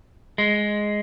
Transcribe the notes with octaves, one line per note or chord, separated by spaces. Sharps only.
G#3